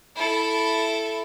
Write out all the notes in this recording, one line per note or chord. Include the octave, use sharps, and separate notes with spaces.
E4 A4